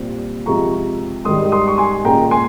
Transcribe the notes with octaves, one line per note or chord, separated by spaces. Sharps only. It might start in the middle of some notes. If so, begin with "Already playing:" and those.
Already playing: A#2 G3 C4
C3 F3 G#3 A#5 C#6
G#2 D#3 G3 C6 D#6
C6 D#6
C#6
G#5 C6
A#2 G#3 C#4 G5 A#5
G#5 C6